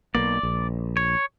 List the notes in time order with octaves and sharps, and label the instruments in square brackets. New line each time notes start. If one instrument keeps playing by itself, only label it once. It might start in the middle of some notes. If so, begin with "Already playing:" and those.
[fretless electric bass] B1 A#3 [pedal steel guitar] D5
[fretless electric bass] A#1
[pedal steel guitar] C#5